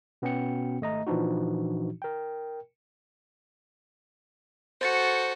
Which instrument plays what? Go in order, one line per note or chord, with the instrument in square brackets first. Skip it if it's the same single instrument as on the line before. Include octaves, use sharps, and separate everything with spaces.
[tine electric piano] B2 B3 C#4 F#4 G5 C#7
G#1 A3 D#5 A#5
A#2 E3 F3 D4 D#4 F#4
A#4 G5
[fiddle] F#4 A4 [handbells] C5 A6 C#7